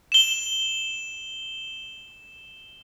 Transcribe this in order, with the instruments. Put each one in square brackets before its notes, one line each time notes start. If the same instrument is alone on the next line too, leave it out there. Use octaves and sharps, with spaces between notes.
[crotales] E7 G7